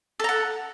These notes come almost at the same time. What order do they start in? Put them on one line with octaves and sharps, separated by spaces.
A4 A#5 F#5